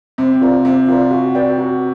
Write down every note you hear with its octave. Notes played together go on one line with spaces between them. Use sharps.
C3 C4
F4 A#4 D5
C3 C4
F4 A#4 D5
F#4
B4 D5 G5
F#4